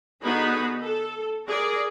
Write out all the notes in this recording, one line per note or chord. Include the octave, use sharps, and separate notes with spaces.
D3 B3 D#4 F#4 G#4 B5
A4
G#4 A#4 D5